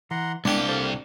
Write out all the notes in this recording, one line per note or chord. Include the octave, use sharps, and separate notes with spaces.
E3 F#5 A#5 C6
C2 G#3 A#3 B3 D4 G4 G5
A4 C5 F5